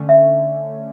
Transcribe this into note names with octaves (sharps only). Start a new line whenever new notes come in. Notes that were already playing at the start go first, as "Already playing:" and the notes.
Already playing: D3 A3 C#4
E5